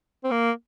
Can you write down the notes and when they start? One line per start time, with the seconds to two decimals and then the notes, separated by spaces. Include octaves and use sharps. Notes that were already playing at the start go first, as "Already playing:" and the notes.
0.24 C4
0.31 A#3